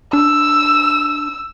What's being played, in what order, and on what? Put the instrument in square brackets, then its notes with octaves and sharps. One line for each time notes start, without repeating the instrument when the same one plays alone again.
[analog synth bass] D4 [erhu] E6